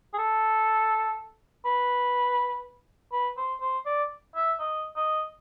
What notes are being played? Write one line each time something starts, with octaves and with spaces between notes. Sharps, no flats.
G#4
A4
B4
B4
C5
C5
D5
E5
D#5
D#5